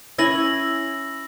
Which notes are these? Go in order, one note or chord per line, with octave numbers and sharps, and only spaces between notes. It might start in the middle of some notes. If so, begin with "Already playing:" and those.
C#4 E4 G#5 E6 A#6 F#7